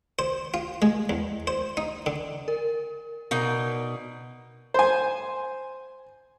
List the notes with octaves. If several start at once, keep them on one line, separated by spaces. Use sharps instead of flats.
C5
F4
G#3
E2
C5
D#4
D3
A#4
B2 D#4 A#4 D5
C5 G#5